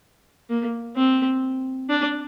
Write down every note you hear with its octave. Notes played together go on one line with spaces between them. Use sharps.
A#3
C4
D4